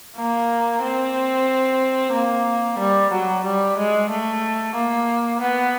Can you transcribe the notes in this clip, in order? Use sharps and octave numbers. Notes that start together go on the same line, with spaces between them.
A#3
C4
A#3
G3
F#3
G3
G#3
A3
A#3
B3